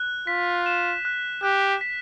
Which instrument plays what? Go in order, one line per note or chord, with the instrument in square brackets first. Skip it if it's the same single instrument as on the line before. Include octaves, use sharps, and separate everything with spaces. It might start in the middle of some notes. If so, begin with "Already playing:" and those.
Already playing: [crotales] F#6
[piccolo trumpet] F4 [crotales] B6
[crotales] E7
F#6
[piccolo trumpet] G4 [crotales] F#6
[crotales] B6